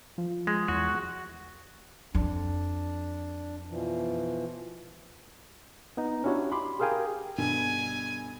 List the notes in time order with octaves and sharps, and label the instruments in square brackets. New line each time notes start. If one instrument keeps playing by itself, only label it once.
[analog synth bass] F3
[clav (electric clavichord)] G#3
[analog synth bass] E2 [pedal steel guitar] F#4
[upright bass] F2 [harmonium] D4
[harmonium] B2 E3 F3
[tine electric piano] B3 D#4
C#4 D4 E4 F#4 G4 C#5
B5 C6 D6
G4 G#4 A#4 F5 G5 G#5
[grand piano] G2 B2 D3 [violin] G#5